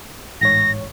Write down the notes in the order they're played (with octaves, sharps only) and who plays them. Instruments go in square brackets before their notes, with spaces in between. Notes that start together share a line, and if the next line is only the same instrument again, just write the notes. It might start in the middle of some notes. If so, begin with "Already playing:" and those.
[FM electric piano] A1 G#2 C#5 [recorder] A#6